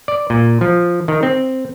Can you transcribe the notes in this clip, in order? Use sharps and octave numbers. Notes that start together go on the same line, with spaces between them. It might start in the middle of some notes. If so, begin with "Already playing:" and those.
D5
A#2
F3
D#3
C4